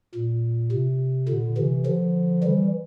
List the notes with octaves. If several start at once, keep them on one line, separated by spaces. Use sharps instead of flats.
A#2
C3
A#2 D3
C3 E3
D3 F3
E3 G3